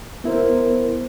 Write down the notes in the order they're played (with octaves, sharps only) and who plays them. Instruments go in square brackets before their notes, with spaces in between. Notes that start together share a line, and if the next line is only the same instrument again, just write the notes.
[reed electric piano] B3 E4 A#4 C5